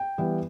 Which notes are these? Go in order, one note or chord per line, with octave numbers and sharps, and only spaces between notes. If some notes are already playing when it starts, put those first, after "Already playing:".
Already playing: G5
E3 G3 B3